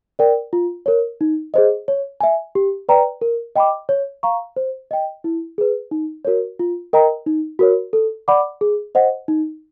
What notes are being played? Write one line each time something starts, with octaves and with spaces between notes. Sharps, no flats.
A#4 D5 G5
F4
A#4 C#5
D#4
G#4 C5 D#5
C#5
E5 G#5
G4
B4 D5 G5 A#5
A#4
D#5 G5 B5 D6
C#5
F5 A#5 C#6
C5
D#5 G5
E4
G#4 B4
D#4
F#4 A#4 C#5
F4
A#4 D#5 G5 A#5
D#4
F#4 A#4 C#5
A4
D5 F#5 B5 D6
G#4
C5 D#5 F#5
D#4